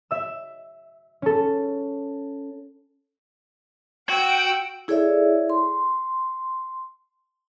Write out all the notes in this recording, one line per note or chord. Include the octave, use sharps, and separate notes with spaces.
E5 E6
C#4 A4
F#4 F#5 G5 E6 D7
E4 G#4 A4 C#5 D5 E5
C6